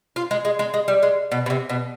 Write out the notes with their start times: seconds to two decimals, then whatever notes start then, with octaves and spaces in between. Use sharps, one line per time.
0.16 F4
0.31 G#3
0.45 G#3
0.59 G#3
0.74 G#3
0.88 G3
1.03 G#3
1.32 B2
1.46 B2
1.50 C3
1.70 B2